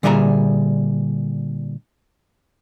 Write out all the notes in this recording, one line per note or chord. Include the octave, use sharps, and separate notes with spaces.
A#2 D3 G3 G#4 E5 A#5